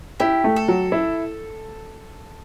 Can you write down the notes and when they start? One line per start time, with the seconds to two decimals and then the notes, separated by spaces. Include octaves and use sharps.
0.20 E4 G4
0.44 A3
0.56 A4
0.68 F#3
0.92 E4